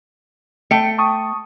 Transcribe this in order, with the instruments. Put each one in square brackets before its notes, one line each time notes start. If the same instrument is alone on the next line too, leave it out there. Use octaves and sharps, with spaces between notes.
[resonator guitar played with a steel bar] A3 G5 [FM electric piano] C#7
[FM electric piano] A5 C#6 D#6